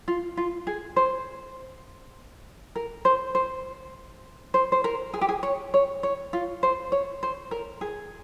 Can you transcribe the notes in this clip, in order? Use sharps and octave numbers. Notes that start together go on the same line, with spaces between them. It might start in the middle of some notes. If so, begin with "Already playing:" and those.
F4
F4
G#4
C5
A#4
C5
C5
C5
C5
A#4
G#4
G4
G#4
C#5
C#5
C#5
F4
C5
C#5
C5
A#4
G#4